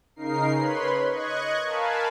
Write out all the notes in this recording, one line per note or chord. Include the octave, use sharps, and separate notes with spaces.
C#3 D#4 A#4 C7
B4 C#5 B5 C6
D#5 C#6 F#6 G#6
A#4 F5 G#5 A5 B5